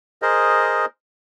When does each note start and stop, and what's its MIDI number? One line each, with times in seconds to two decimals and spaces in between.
0.22 0.85 68
0.22 0.85 70
0.22 0.85 72
0.22 0.85 75